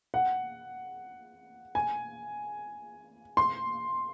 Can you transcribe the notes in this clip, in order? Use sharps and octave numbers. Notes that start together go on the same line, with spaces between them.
F#5
G#5
C6